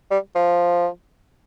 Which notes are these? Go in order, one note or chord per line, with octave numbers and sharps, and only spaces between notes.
G3
F3